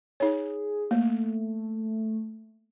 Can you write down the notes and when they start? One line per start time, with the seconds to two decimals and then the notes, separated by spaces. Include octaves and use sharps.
0.20 D#4 G#4 C#5
0.91 A3 A#3